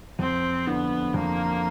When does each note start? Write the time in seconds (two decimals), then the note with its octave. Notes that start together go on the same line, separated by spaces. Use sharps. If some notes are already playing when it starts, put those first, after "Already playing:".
0.19 F2 C4
0.67 D3 B3
1.14 F2 A#3